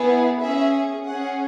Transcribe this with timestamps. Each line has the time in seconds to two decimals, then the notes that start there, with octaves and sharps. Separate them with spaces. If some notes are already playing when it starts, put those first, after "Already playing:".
Already playing: B3 E4 G#4
0.41 C#4 G#4 E5
1.06 C#4 G#4 F#5